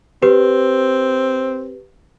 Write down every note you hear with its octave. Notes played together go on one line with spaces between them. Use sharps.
C4 G4 B4